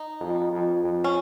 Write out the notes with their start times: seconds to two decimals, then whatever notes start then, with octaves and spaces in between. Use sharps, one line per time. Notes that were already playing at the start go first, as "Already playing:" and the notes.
Already playing: D#4
0.20 F2
0.52 F2
0.83 F2
1.04 C#4